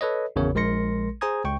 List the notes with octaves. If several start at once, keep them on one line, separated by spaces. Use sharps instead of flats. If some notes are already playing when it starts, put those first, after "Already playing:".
A4 B4 C#5 D#5
G#1 E2 C#3 A#4 C#5
A#1 G#3 A#4 C6 A#6 C#7
G#4 C5 G#5 A#5 D#6 G#6
C#2 G5 C#6